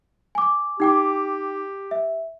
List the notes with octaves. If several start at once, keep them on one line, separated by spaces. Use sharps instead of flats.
G#5 D6
D#4 G4 G5 D6
E5